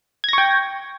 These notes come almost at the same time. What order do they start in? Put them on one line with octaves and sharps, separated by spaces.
G#6 A#6 C#6 G5